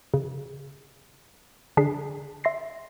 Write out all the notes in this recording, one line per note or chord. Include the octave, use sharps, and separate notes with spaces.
C#3
D3 D4 G#4 B6 C7
E5 C6 A#6 C7